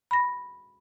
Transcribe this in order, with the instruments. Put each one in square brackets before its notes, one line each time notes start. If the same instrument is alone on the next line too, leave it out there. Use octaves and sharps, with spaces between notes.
[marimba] B5 A#6